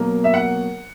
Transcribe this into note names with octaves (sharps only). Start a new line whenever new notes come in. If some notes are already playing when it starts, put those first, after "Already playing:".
Already playing: B2 F#3 A#3
E5
F#5